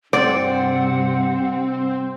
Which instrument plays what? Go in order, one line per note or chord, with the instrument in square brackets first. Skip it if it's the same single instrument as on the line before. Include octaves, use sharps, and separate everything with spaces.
[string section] G2 C3 [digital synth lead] C4 [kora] D5 [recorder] F#5